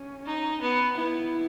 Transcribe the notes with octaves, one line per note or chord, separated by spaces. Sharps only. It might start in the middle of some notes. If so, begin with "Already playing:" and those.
Already playing: C#4
D#4
B3
B3 E4